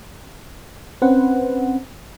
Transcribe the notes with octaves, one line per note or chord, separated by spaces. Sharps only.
C4 C#4 B4 C5 F#5